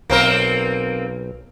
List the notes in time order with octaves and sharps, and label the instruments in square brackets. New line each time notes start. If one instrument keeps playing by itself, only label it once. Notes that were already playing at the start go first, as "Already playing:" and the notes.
[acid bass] B1 [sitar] A#3 C4 A#4